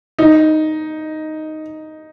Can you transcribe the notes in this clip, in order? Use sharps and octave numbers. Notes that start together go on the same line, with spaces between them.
D#4